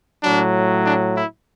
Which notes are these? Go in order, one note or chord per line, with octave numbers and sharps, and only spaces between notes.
A2 F#3 D4
D4
E4